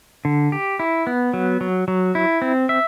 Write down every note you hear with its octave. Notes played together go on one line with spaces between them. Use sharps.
D3
G4
E4
B3
F#3
F#3
F#3
E4
C4
E5